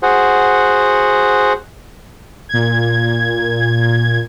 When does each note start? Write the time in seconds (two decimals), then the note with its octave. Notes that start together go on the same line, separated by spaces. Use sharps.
0.03 F#4 G#4 C5 F#5
2.49 A#2 G#6